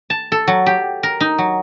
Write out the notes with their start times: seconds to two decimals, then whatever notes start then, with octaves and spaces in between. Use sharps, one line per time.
0.10 A5
0.32 A4
0.48 F#3
0.66 G4
1.03 A#4
1.20 D#4
1.38 F#3